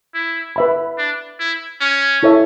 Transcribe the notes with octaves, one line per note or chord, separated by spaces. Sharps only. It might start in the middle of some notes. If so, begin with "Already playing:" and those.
E4
B4 E5 B5
D4
E4
C#4
E4 A4 C#5 E5 A5